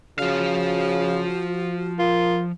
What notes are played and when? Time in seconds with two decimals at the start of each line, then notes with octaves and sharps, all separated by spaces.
0.19 C#3 F3 F#4 F5
1.99 F4 A#4